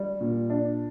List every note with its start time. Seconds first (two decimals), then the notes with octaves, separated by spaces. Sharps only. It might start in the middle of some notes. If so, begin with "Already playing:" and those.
Already playing: G3
0.21 A#2
0.50 D4